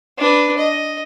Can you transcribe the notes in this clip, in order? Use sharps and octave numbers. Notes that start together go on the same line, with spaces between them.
D4 B4
D#5